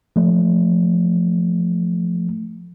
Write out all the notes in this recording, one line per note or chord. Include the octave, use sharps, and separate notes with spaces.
F3 A3